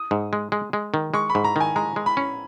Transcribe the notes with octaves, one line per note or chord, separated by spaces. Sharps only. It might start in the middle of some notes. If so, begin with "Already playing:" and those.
Already playing: D#6
G#2
G#3
G#3
G#3
D#3
G#3 C#6
B5
G#2
A#5
D#3 G#5
G#3 A#5
G#3
B5
C#4